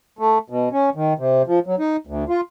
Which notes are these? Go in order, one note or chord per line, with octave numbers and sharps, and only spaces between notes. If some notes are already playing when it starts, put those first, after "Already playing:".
A3
B2
C#4
D#3
C3
F3
F#3
D#4
D2
F4